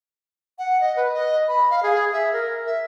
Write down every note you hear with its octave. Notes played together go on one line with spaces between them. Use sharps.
F#5
D#5
B4
D#5
B5
F5
G#4
E5
A#4
E5